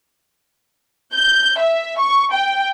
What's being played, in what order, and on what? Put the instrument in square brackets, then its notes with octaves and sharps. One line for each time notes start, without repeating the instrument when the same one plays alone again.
[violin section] G6
E5
C#6
G5